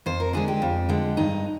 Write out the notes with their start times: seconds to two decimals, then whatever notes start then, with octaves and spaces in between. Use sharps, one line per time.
0.06 F2 C5
0.20 A#4
0.33 D3 G#3 G#4
0.48 G4
0.62 F2
0.89 D3 G#3
1.17 G2 D#4